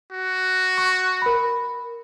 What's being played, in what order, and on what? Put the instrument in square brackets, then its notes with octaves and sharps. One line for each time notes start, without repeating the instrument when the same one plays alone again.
[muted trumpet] F#4
[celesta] C#6
A#4 B5